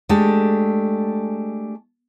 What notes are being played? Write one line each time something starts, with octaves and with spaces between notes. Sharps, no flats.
G#3 A3 D4 G4 A4